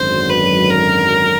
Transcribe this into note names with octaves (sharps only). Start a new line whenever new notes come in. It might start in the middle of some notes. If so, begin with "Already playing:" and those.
Already playing: G#1 F#2 D3 F#3 C5
B4
A#4